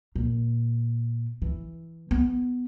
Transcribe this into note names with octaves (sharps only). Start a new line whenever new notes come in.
A#2
E3
B3